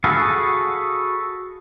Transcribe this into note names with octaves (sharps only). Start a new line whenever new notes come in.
F#4 G#4 A4 B4 F5